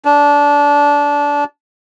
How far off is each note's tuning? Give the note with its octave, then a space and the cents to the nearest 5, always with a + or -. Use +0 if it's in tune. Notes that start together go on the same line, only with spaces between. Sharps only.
D4 -20